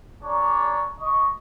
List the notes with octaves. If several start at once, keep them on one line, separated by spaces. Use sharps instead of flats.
D4 G#4 C#5 D5 A#5
D#5 C#6